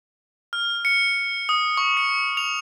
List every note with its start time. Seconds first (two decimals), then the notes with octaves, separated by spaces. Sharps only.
0.53 F6
0.85 C#7
1.49 D#6
1.77 C#6
1.97 C#7
2.37 F7